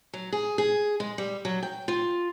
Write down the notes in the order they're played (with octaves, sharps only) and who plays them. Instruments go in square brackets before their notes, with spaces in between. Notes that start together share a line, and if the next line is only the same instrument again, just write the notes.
[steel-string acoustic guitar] F#3
G#4
G#4
G#3
G3
F#3
G5
F4